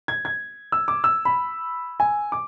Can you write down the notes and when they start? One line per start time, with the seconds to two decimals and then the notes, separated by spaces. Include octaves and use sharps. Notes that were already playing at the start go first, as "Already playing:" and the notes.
0.08 G#6
0.25 G#6
0.72 E6
0.88 D6
1.04 E6
1.25 B5
2.00 G#5
2.32 D6